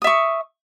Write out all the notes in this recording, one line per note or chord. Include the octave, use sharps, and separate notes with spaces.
E5 C#6 D#6